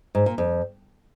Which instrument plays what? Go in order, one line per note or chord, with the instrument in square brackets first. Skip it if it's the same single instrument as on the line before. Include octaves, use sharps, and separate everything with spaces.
[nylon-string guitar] G#2
A#2
F2